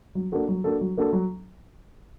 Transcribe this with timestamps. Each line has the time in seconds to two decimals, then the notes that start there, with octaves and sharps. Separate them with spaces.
0.15 F#3
0.32 A#3 D4 F#4 A4
0.48 F#3
0.64 A#3 D4 F#4 A4
0.81 F#3
0.97 A#3 D4 F#4 A4
1.13 F#3